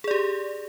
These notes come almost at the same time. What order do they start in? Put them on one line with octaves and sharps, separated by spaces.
G#4 D5 G4